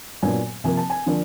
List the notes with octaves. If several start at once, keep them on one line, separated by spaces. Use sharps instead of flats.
A#2 F#3 B3 D4 G#5
C3 F3 A#3 G#5
A5
G#5
D3 F3 A#3 D4